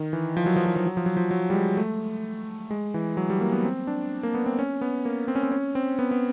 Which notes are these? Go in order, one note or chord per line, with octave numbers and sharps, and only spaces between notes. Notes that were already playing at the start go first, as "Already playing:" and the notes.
Already playing: D#3
E3
F3
F#3
F3
F#3
F3
F#3
F3
F#3
F3
F#3
G3
G#3
A3
G#3
E3
F#3
G3
A#3
B3
C4
D4
A#3
B3
C4
C#4
B3
A#3
C4
C#4
C4
C#4
C4
B3
B3